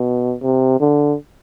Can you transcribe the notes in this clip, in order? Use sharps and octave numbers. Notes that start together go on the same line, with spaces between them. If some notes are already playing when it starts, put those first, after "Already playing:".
Already playing: B2
C3
D3